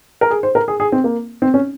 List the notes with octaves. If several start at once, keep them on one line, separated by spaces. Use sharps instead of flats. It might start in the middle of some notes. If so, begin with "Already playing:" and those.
A#4
G#4
C5
A#4
G#4
G#4
C4
A#3
C4
C#4